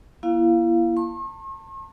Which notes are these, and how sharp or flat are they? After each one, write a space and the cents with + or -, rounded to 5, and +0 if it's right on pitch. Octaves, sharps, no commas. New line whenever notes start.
A#3 +35 E4 +30 F5 +0
A5 +25 C#6 -45